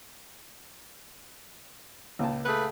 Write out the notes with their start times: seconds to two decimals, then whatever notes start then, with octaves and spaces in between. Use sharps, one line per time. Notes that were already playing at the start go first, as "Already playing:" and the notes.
2.19 C#2 A#2 A5
2.46 A3 G#4 B4